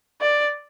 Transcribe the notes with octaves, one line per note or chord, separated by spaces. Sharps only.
D5